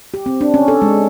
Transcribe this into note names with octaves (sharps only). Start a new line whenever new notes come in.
G4
C4
D4
C#4
A4
G#3